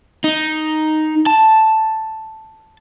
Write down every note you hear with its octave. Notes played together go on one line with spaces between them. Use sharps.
D#4
A5